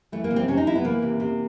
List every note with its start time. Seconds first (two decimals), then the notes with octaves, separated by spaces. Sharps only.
0.12 E3 A3
0.24 A#3
0.30 C3
0.36 C4
0.48 C3 C#4
0.57 D#4
0.67 E3 E4
0.75 B3
0.85 E3 A#3
1.02 C3
1.20 C3